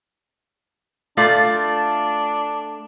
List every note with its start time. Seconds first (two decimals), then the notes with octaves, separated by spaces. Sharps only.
1.17 A3 D4 F4 D5